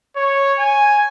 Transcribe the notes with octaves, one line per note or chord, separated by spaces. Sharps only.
C#5
G#5